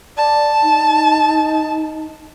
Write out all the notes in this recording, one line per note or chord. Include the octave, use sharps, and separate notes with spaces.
D5 A5
D#4